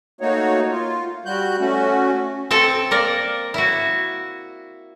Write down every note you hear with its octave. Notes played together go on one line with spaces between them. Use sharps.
A3 A#3 D#4 F#4 C#5
F4
G3 F#4 F#6 G6
A3 C#4 F#4
C4 A4 G5 A5
A#3 A#4 D5
E4 F#4